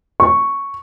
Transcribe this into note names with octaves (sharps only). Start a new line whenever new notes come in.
C#6